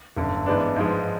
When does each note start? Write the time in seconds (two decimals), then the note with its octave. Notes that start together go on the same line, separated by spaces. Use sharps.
0.17 G1 F#2 D3
0.46 G#2 E3 G#3 B3 D4
0.76 G#2 F3 G#3